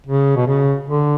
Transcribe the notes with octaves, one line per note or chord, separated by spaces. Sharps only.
C#3
B2
C#3
D3